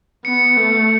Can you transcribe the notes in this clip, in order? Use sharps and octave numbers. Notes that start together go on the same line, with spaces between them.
B3 C#7
A3